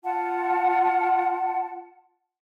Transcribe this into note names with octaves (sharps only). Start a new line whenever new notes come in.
F4 F#5 A5